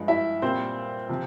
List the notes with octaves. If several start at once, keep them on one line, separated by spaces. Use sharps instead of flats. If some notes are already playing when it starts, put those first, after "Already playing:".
Already playing: G2 F3 G#3
E4 E5
A#2 G3 C4 C5
C3 F3